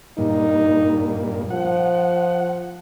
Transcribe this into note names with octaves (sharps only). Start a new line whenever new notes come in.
G2 A#2 D#4
F3 F#5